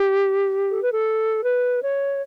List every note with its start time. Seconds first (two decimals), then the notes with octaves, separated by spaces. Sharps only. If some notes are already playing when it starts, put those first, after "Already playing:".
Already playing: G4
0.70 A4
0.81 B4
0.91 A4
1.44 B4
1.81 C#5